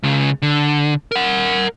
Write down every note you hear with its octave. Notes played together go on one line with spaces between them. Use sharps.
C#2 C#3
D3
A#4 F#5